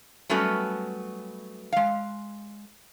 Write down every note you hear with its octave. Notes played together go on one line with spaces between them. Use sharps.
F#3 G3 A3 B3 C#4 F#4
G#3 F5